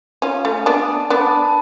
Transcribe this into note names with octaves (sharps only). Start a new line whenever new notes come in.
C#4 F4
A3 C#4
B3 D4 G#5
A5
B3 D4 B5
A5
A5
A5